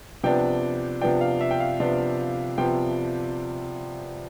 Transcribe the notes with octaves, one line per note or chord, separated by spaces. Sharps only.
C3 F3 B3 D4 G5
C3 F3 B3 D4 G5
F5
E5
G5
F5
C3 F3 B3 D4
C3 F3 B3 G5